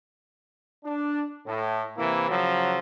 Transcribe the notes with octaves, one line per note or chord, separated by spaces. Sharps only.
D4
A2
C3 E3 A#3 E4
C#3 F3 F#3